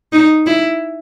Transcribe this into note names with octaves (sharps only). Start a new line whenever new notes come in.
D#4
E4